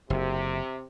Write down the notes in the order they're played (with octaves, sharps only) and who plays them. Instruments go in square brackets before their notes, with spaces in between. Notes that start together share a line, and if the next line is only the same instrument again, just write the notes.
[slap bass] F#1 [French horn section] C3